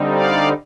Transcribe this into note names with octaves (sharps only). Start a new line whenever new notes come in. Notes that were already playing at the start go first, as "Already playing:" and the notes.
Already playing: D3 G3 C4 D#4
D5 F5